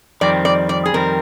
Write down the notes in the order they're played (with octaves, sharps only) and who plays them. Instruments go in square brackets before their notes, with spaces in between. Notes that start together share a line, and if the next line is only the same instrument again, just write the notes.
[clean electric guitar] F2 D#3 G3 C4 [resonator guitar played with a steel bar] D5
[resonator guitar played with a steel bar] D5
D5
G#4
[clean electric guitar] F2 D#3 G3 C4 [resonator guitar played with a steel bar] A#4